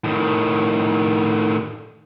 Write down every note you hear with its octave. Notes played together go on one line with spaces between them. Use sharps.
A2 D#3